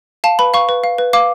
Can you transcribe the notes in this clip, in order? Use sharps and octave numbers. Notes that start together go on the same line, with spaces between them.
F5 A5
B4 B5
F5 C#6
B4
F5
B4
F5 D6